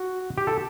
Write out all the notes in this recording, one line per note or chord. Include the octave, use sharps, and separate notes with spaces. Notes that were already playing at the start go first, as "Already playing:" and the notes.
Already playing: F#4
G4
A4